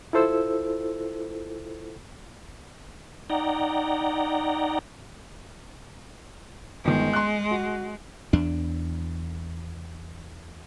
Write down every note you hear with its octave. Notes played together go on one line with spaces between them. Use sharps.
E4 F4 A4 C5 E6
D#4 D5 F#5 G5 A#5
G1 D#3 G#3
C6 F#6
F#4
E2 D4